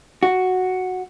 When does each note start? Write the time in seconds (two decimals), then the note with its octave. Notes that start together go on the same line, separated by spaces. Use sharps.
0.23 F#4